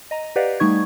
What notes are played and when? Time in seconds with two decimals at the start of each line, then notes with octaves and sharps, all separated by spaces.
0.11 D#5 A#5
0.36 G4 B4 D5 D#5 F5 F#5
0.60 G3 A3 D#4 C#6 G#6